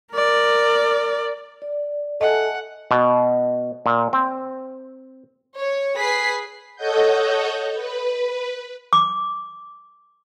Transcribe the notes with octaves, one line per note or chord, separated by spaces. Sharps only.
A#4 D5
D5
A4 D#5 E5 F#5 G#5 A5
B2
A#2
C4
C#5
G#4 B4 B6 C7
A4 C#5 D#5 F#5 G6
B4
D6